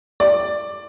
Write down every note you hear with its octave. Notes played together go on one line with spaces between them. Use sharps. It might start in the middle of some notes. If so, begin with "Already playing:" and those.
D5